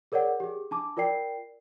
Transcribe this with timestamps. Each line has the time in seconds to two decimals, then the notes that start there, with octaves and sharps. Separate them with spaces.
0.12 G#4 A#4 C#5 D5 F#5
0.40 G4 G#4
0.71 D4 A5 D6
0.97 F4 A#4 D5 G5 C7